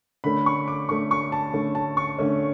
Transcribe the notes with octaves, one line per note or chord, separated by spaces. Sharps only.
D3 A3 C#4 B5
C#6
D6
D3 A3 C#4 C#6
C#6
A5
D3 A3 C#4
A5
C#6
D3 A3 C#4